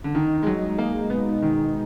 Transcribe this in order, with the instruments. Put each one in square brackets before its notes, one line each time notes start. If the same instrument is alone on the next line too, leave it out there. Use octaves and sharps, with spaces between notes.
[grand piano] D3
[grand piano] D#3 [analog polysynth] D#4
[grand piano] G#3
F#3
[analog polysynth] G#3
[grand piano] A#3
[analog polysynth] B2 [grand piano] B3
[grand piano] D#3
[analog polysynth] B2